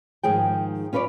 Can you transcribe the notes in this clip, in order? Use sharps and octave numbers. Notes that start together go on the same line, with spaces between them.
G#2 D#3 F3 G#4 G5
C#4 F4 B4 C#5 D5